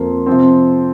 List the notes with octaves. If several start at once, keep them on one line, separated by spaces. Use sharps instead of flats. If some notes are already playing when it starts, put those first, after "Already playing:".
Already playing: F2 F3 A#3 C6
C3 F3 C4